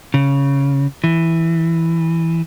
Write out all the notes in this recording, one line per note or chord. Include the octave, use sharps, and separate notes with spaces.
C#3
E3